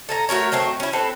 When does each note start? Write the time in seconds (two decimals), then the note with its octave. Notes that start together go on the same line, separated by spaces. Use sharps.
0.09 A4 G#5 A#5
0.29 A3 F#4 A#4 C#5
0.52 F#3 A3 C4 E5
0.80 C#4 E4
0.93 C4 A4 B4